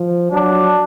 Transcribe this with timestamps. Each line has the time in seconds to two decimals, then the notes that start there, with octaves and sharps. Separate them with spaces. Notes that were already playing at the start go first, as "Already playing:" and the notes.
Already playing: F3
0.32 F#3 D4